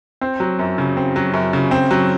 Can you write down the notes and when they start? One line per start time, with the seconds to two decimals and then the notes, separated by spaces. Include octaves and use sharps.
0.21 C4
0.40 F#3
0.59 F#2
0.78 C#3
0.97 C4
1.16 F#3
1.34 F#2
1.53 C#3
1.71 C4
1.91 F#3